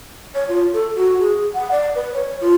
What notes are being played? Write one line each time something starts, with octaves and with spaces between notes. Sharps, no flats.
C#5
F4
A4
F#4
G#4
F#5
D5
B4
C#5
F4